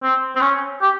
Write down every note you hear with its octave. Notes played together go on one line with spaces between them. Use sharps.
C4
C4
C#4
G4